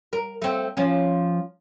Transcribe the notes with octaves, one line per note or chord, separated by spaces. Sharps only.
A#4
A3 C4
F3 C#4